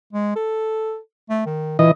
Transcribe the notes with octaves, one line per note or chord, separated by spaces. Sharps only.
G#3
A4
A3
D#3
A#2 E3 D#5